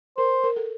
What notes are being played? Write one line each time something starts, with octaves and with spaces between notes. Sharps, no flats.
A#4 C5
A#4
A4